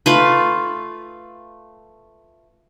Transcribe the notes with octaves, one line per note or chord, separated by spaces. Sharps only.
A3 F4 B4